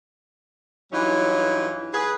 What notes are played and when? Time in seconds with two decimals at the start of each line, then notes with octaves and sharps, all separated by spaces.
0.92 G2 E3 F#3 C#4 D#4 F4
1.94 G#4 B4